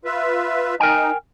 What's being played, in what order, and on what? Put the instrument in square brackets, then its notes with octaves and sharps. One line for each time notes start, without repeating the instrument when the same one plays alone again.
[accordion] F4 B4 E5
[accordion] D#4 [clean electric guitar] A#4 G5 G#5